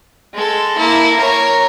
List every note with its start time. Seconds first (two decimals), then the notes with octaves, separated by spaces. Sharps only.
0.34 G#3 A4
0.78 A#3 E4
1.17 A#4 C#5